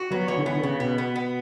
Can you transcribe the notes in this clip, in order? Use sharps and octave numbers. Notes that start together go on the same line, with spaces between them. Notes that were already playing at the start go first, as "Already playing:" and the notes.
Already playing: F#4
F#3 B3
E3 C#5
D3
E3 B3
D3
C#3 B3
B2 B3
B3
B3